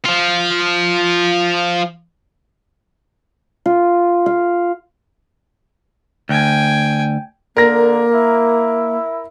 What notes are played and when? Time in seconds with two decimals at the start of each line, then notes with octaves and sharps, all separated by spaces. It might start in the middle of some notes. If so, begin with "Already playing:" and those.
0.06 F3 F4
3.66 F4
4.26 F5
6.29 D2 G5 G#5
7.57 D3 A#3 A#4 A#6
8.14 E4